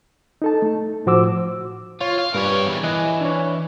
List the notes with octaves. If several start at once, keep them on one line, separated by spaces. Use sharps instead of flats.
D#4 A4 A5
A3
A2 F3 F#4 C5 D6 E6
F4 C#5
F5
G2 G3 A#4 B4 C#5
E2 G3
E3 D#5 F#6
D4 C#5